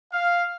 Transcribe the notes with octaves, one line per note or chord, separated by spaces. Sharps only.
F5